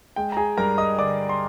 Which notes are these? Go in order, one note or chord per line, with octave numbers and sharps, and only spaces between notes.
G#3 G5
A#5
G#4 G#5
G2 A#4 A#5
D#5 D#6
D3 D5 D6
C6